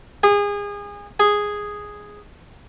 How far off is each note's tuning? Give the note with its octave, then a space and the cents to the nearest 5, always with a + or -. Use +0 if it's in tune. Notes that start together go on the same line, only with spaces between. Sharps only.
G#4 -30
G#4 -5